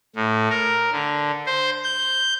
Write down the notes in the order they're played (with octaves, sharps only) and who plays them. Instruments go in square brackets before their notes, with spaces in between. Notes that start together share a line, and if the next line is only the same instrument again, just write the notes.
[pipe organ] A2
A#4
D3
C5
G6